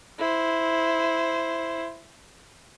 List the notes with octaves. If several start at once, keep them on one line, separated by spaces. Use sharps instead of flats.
E4 C5